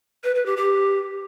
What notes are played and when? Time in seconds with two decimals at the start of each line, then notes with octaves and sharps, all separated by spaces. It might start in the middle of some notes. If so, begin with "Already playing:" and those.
0.24 B4
0.35 B4
0.46 G4
0.57 G4